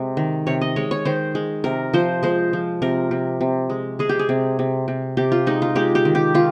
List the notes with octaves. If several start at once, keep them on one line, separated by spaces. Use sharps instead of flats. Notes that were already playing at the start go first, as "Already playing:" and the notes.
Already playing: C3 G#3
D#3
C3 C#5
D#5
G#3 C#5
C#5
D#3 C5
G#3
C3 A#4
F3 C5
G#3 C5
F3
C3 A#4
C3
C3
G#3
G#3 G#4
G4
G#4
C3
C3
C3
C3 G4
F4
G#3 D#4
F4
G#3 G4
G4
D#3
G4
D#3 F4